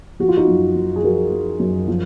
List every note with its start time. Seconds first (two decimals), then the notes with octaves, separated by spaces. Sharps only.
0.20 F3 F#4
0.28 F4
0.37 D#4 F#4
0.47 F#2
0.75 F#2
0.96 G#4
1.03 F3 F#4 A#4
1.31 F3
1.60 F#2
1.88 F3